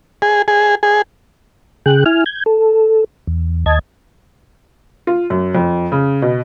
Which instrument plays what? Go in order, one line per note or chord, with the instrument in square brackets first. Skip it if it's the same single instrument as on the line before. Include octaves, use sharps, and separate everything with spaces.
[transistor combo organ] G#4
G#4
G#4
[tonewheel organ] C#3 G#4 G5 F#6
E4 G#5 F6
G6 G#6
A4
E2
D#2 D#5 A5 G#6
[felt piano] F4
F#2
F2
C#3
B2